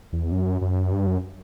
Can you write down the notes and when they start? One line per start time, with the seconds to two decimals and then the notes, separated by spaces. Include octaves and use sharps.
0.12 E2
0.32 F#2
0.61 F#2
0.92 G2
1.07 F#2